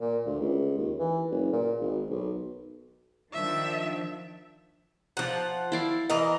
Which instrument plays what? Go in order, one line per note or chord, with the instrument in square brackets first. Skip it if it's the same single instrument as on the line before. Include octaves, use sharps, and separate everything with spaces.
[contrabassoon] A#2
D2
C#2
D#2
E3
F#1
A#2
G#1
B1
[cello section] D#3 F3 D4 [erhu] E5
[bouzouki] F3 F#5
[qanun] E4 D5 F5
[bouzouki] E3 A#4 D#5